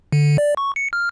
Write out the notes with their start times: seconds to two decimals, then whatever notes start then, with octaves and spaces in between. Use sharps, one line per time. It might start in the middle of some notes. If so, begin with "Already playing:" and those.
0.12 D3
0.38 D5
0.57 C#6
0.76 C#7
0.93 F6